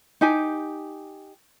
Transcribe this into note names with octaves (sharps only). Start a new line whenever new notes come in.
D#4 G4 G#5